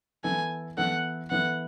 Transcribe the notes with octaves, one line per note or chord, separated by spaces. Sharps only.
E3 B3 E4 A4 G#5
E3 B3 E4 A4 F#5
E3 B3 E4 A4 F#5